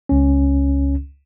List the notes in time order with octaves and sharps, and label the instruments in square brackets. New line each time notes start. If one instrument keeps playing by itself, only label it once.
[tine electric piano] C#2 C#4